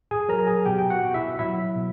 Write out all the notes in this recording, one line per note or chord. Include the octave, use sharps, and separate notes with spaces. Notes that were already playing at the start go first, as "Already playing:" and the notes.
G#4 G#5
F#3 A#4 A#5
G#4 G#5
B2 G4 G5
G5
F#4 F#5
B2
E4 E5
F#3 E4 E5
B2